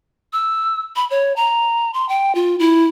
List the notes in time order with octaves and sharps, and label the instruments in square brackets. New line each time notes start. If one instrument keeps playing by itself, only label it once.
[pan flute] E6
B5
C#5
A#5
C6
G5
F4
E4